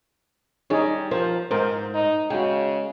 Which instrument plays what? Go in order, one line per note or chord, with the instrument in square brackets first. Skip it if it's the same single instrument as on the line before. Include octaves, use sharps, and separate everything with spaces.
[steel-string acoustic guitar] G3 [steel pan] D#4 G#4 C#5
[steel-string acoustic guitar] F3 [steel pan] A#4 C5
[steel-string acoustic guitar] G#2 [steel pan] A#4 C5
[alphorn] D#4
[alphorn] C#3 [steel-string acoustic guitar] G#3 [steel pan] F#4 G5